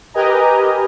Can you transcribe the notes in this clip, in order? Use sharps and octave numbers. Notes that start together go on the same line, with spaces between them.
G4 A#4 B4 D#5 G#5 A#5